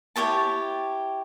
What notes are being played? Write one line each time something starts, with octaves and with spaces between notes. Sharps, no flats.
E4 G4 C#5 A5